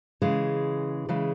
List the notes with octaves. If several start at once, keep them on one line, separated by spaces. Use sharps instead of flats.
C#3 E3 G#3
C#3 E3 G#3